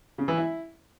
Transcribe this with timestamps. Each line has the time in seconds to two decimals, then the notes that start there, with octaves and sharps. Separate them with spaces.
0.18 C#3
0.28 E3
0.38 E4